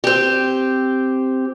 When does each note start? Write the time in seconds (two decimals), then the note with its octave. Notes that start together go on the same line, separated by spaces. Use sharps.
0.04 C4 G4